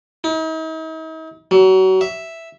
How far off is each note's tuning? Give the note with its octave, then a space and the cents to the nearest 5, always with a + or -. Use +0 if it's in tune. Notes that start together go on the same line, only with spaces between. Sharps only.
D#4 +45
F#3 +30
E5 +0